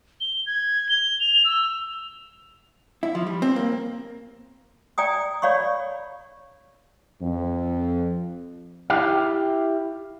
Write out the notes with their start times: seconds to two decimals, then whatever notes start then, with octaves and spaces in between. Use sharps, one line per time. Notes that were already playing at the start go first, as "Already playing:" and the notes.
0.20 G7
0.46 G#6
0.89 G7
1.20 F7
1.45 E6
3.03 E4
3.15 F3
3.27 G3
3.42 C4
3.56 A#3
4.98 D5 G5 G#5 A#5 D#6
5.42 C#5 D5 F5 B5 C#6
7.21 F2
8.90 E4 G4 E5 F5